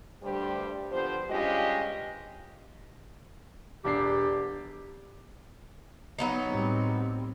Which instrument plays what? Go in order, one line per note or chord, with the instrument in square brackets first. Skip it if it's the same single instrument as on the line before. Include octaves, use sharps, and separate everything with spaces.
[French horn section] D2 G2 G3 D4 G4 C5
D3 F3 B3 G4 C5
G2 G#3 C#4 F4 G4 D#5
[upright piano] E1 D4 C7 [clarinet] G4
[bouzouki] F#3 B3 D#4
[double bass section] A2 G3 C4